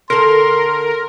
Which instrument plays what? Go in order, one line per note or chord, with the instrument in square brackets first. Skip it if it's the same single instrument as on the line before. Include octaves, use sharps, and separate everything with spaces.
[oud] D3 A4 [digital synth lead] A#4 [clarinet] C6